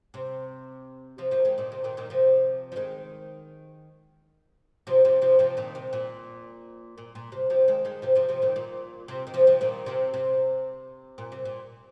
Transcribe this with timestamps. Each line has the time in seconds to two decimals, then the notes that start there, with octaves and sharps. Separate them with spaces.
0.14 C3
1.18 C3 F3
1.31 F3 A#3
1.45 D#3 G#3
1.58 A#2 D#3
1.72 C3
1.84 A#2 D#3
1.97 A#2 D#3
2.10 C3 F3
2.72 F3
2.76 D#3 G#3
4.87 C3 F3
5.05 C3 F3
5.22 C3 F3
5.39 C3 F3
5.57 A#2 D#3
5.75 C3
5.93 A#2
6.98 A#2
7.15 A#2
7.32 C3
7.50 C3 F3
7.68 D#3 G#3
7.85 D#3 G#3
8.02 C3 F3
8.15 C3 F3
8.29 C3 F3
8.42 A#2 D#3
8.56 A#2
9.08 C3
9.27 D#3
9.34 C3 F3
9.47 C3 F3
9.61 A#2 D#3
9.86 C3
10.14 C3
11.18 A#2
11.32 C3
11.45 A#2